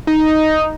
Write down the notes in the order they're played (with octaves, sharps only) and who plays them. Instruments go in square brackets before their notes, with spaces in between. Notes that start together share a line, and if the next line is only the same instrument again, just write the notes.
[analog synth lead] D#4